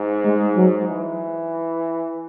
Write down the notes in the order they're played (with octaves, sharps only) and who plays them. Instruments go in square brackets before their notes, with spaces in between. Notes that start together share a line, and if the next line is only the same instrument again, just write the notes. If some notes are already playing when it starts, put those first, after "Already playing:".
Already playing: [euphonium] G#2
[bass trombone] G#3
F#3
[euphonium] E3